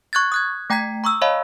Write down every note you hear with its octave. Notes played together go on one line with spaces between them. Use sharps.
C#6 F#6 G#6 A6
D#6 F#6 G#6
A3 G5 A#5 G#6 B6
A#5 C#6 D#6 E6
C#5 D#5 F5 A5 B5